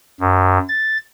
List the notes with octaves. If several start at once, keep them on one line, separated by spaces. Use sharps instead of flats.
F#2
A6